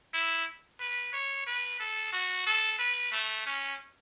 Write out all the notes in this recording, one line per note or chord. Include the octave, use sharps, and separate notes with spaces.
E4
B4
C#5
B4
A4
F#4
A4
B4
A3
C#4